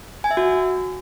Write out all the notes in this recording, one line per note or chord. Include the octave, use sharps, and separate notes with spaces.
G#5
E5
F#4